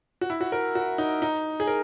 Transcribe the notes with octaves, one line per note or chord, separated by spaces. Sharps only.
F#4
E4
F#4
A#4
F#4
D#4
D#4
G#4
A#4